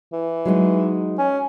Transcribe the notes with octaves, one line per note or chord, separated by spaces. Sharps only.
E3
F#3 G#3 D#4
C#4